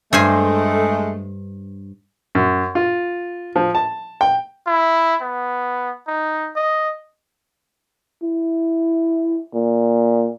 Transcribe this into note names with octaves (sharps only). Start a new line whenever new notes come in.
G2 G#3 A3 C5 G#5
F#2
F4
F3
A5
G5
E4
B3
D#4
D#5
E4
A#2